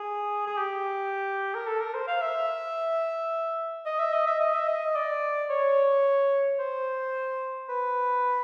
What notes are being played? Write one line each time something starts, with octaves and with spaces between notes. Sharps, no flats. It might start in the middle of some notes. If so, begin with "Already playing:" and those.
Already playing: G#4
G#4
G4
A#4
A4
A#4
C5
F5
E5
D#5
E5
D#5
E5
D#5
E5
D#5
D5
C#5
C5
B4